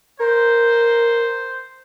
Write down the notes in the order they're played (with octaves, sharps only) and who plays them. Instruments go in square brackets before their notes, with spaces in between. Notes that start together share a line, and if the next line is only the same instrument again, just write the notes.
[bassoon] A#4 [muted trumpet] C5